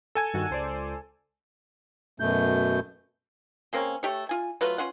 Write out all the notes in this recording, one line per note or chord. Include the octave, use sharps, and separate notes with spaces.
A4 G#5 G#6
G2 D#3 F#4
C#2 C5 D5
F#2 B2 A3 G6
C#3 A#3 C4 C#4
A3 G4 C#5
F4 G#5
F#3 A3 F4 B4
C#4 F4 F#5